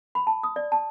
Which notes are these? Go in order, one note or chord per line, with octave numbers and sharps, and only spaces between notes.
B5
A5
D#6
D5
A5